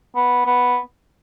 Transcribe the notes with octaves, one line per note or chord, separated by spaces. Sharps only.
B3
B3